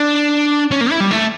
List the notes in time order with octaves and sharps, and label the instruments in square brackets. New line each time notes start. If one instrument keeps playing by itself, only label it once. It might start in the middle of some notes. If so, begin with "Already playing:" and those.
Already playing: [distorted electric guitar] D4
C#4
A#3
E4
G3
A3